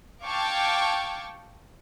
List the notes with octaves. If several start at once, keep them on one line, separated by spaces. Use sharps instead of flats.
F5 G5 A5 C#6 D6 G#6